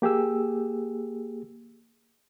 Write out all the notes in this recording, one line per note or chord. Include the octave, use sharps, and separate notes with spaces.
A#3 G4 G#4 E6